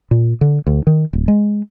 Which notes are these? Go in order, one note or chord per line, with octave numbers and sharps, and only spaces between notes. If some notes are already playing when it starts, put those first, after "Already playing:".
A#2
D3
D2
D#3
D1
G#3